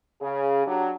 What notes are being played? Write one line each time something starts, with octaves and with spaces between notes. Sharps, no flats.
C#3 G#4
F#3 D4 G4